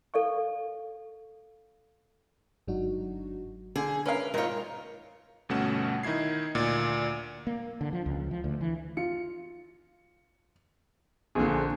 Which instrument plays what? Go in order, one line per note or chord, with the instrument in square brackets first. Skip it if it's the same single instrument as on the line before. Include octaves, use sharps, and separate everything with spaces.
[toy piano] A4 D5 F5 C#6
[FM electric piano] G1 G#2 F#3 D4 D#4 F#4
[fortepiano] D3 [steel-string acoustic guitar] G#4
[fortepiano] C#4 A#4 F5 [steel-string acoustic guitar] B4
[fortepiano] G#1 F4 [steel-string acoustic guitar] A#4 C#5
[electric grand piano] G1 B2 A3 C#4 F#5 E7
D#3 D#4 E4 G#6 C7
D2 A#2 D5
[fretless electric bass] A#3
D3
F3
C#2
F3
D2
E3
[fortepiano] F4 [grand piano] C#7
[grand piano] A#1 D3 [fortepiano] A#3 C4 G#4